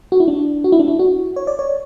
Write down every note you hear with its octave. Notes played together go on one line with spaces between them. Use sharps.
F#4
E4
D4
F#4
E4
D4
E4
F#4
C#5
D5
C#5